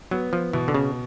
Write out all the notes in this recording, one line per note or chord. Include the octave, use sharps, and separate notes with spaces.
F#3 B3
F3
B2 E3
D3
C#3